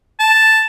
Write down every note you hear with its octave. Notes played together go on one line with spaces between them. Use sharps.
A5